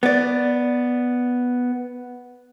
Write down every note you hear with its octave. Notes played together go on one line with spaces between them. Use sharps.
B3 D5